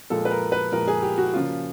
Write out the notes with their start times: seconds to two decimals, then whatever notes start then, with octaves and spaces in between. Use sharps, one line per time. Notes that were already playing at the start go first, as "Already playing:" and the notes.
0.10 A#2 F3 G#3 A4
0.25 B4
0.31 A#4
0.52 B4
0.72 A#2 F3 G#3 A#4
0.88 G#4
1.02 G4
1.18 F#4
1.34 C#3 F3 A#3 C#4 F4